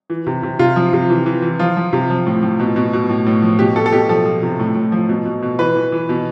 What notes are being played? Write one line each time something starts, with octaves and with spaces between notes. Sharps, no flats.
E3
C3
C3
C3 F4
F3
C3
E3
E3
E3
F3 F4
F3
C3
F3
A2
A2
B2
B2
B2
A2
A2
F3
B2 G4
B2 A4
A4
B2 G4
F3 A4
F3
C3
A2
A2
F3
B2
B2
B2
E3 B4
E3
E3
B2